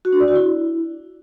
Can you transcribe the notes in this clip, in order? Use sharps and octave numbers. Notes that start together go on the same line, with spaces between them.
F#4
D4
D5
F#4
E4